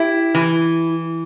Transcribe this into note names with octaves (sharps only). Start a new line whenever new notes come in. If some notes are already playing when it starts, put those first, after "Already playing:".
Already playing: E4 G4
E3